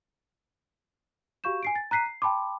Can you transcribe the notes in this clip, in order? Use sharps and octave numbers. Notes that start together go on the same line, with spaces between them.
F#4 G4 F5 C#6 G6 E7
G#5 C7 D7
A6
A#5 F#6 B6 C7 D#7
C7
G5 A5 B5 C6 D6